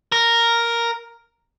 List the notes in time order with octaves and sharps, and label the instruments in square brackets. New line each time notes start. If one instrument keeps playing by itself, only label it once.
[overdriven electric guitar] A#4